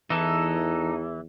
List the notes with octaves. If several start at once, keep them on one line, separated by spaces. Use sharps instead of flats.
E2 E3 D#4 A4